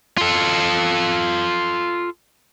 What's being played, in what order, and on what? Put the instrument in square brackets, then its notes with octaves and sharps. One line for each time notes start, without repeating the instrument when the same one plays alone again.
[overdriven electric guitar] F4 A4